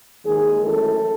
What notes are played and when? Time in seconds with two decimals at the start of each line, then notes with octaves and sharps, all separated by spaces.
0.24 D#2 D#3 G#3 G#4
0.61 F#2 E3 A3 A4